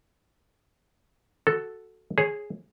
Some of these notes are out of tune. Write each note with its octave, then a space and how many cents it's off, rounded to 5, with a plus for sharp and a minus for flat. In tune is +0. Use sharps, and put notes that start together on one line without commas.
F#4 +0 A4 +0
G#4 +0 C#5 -25